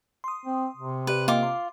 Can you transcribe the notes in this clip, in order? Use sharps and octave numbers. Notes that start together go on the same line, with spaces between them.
C6 D#6
C4
C3
G4 B4 D5
A#3 F4 D#5 G5 D6
C6